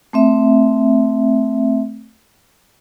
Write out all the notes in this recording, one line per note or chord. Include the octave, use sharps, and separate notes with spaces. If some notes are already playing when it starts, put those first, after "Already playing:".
A3 C4 E5